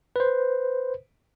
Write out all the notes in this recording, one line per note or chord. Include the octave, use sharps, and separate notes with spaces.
B4 C5